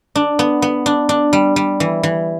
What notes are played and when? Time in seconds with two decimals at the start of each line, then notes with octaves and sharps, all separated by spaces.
0.15 D4
0.39 B3
0.62 B3
0.86 D4
1.09 D4
1.33 G3
1.56 G3
1.80 E3
2.03 E3